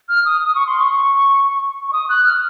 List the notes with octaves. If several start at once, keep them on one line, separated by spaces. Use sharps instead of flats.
F6
D#6
D#6
C#6
C6
C#6
C#6
D#6
F#6
F6